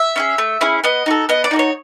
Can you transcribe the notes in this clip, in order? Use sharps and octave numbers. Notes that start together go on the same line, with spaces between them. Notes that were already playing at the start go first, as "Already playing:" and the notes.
Already playing: E5
C#4 E4 G#4
A3
C#4 E4 G#4
B3 D#5
D#4 F#4 A4
B3 D#5
D5
D#4 F#4 A4
C#5